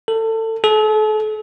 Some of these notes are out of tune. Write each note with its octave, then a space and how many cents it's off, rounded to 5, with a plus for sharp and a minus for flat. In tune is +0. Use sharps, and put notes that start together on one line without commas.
A4 +25
A4 -40